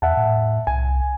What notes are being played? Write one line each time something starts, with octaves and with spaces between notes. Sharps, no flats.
E2 E5 F#5 A5
A2
C2 G#5